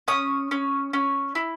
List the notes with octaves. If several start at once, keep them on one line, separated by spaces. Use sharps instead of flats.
C#4 D#6
C#4
C#4
E4